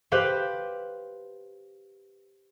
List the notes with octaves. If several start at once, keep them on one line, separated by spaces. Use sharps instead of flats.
G4 B4 C5 F5